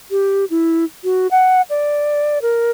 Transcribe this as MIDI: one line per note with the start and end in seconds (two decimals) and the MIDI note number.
0.11 0.45 67
0.50 0.84 64
1.04 1.27 66
1.31 1.62 78
1.70 2.39 74
2.42 2.71 70